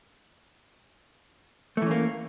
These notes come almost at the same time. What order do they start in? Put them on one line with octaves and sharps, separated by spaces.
A3 E3 C#4 A#3